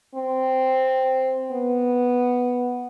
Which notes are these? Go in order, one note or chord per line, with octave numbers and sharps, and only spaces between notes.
C4
B3